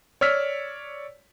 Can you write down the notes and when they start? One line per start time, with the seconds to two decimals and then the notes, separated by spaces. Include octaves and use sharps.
0.21 C#5 D5 E6 F6 B6